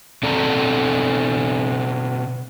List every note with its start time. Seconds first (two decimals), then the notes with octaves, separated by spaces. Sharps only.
0.23 B2 C4 A4 D5 A5 A#5